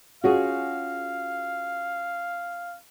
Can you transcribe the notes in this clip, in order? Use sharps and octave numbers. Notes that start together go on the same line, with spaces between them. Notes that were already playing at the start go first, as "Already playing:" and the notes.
C#4 F4 F#4 G#4 F5